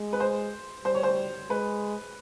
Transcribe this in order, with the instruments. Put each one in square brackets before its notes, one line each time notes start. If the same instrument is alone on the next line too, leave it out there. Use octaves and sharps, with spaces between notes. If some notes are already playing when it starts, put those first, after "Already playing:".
Already playing: [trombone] G#3
[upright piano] B4
C5
[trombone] G3 [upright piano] C5
[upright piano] C#5
C5
[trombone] G#3 [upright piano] B4